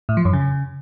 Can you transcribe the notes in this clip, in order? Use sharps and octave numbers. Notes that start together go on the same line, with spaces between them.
A2
F3
F#2
C#3